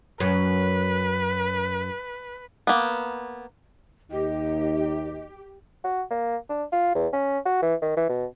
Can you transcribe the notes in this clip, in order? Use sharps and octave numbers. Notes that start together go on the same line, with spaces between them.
F#2 B4
A#3 B3
D#2 D#4 G4 D#5
F#4
A#3
D4
F4
E2
C#4
F#4
E3
D#3
E3
B2